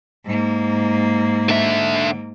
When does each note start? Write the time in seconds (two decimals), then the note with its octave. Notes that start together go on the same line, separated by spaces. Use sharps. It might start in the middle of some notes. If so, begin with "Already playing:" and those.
0.25 G#2 A#3
1.49 D3 E5